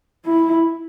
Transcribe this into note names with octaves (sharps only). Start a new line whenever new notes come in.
E4